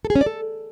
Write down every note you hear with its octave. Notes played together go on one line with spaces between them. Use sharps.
A4
G#4
C#4
D5
A4